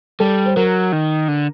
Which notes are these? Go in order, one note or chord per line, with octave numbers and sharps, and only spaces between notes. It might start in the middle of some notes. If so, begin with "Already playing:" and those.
G3 A4
C5
F#3 A#4
D#3
D3